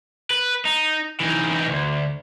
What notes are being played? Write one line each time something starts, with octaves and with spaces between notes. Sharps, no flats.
B4
D#4
E3 D#4
D2